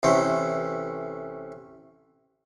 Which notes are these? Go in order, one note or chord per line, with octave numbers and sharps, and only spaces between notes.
A1 C3 E3 A3 G5